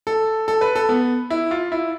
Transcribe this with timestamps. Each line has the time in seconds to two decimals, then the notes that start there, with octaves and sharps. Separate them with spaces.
0.07 A4
0.48 A4
0.61 B4
0.75 A4
0.89 B3
1.30 E4
1.51 F4
1.72 E4